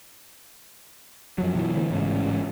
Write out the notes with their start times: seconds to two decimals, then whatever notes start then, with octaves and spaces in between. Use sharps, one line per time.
1.38 F#2 F3 F#3
1.54 B2 E3 F#3
1.74 D3 E3 A3
1.91 A1 G#2 C#3